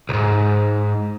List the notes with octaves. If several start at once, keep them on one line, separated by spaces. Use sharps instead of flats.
C2 G#2